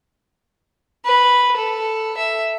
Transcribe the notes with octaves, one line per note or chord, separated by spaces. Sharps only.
B4
A4
E5